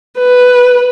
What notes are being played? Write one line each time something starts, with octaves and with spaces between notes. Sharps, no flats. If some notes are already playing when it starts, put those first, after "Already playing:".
B4